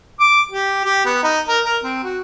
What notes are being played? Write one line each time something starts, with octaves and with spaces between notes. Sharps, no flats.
D6
G4
G4
B3
D#4
A#4
A#4
C4
F#4